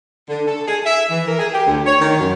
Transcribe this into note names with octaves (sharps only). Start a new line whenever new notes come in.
D3
A4
G#4
E5
E3
A#4
G#4
G4
D2
C#5
D#3
F#2